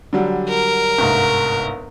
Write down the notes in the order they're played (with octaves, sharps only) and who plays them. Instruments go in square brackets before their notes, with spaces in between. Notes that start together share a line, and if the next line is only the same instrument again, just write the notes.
[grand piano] D3 F#3 G3
[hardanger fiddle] A#4
[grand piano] G1 C2 G#2